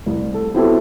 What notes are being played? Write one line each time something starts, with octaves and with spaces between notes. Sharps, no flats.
C2
A4
B3 C4 E4 F#4 G4 A4